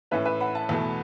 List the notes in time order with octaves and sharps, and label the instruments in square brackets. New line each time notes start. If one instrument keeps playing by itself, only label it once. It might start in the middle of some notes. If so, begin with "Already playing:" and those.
[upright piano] A2 E3 C#4 [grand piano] B4 E5
[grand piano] B4 E5
F#5 B5
E5 A5
[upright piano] E2 B2 A3